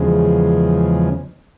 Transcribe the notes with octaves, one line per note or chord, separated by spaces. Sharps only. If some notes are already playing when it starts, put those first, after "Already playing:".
Already playing: E2 C#3 F3 G#3